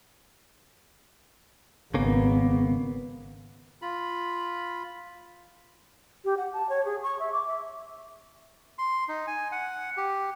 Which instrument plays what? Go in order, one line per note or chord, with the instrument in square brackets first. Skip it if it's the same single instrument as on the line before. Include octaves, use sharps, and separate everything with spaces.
[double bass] G#1 B3 [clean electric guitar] C#3 A#3
[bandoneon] F4 B5
[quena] G4
F#5
A5
C#5
G#4
C#6
E5
D6
E5
[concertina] C6
D#4
G#5
F#5
G4